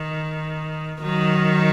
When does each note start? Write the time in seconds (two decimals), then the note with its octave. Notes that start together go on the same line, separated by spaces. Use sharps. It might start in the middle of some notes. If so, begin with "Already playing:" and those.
Already playing: D#3
1.02 D#3 F#3